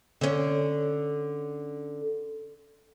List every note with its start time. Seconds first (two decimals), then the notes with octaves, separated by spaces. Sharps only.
0.21 D3 C#4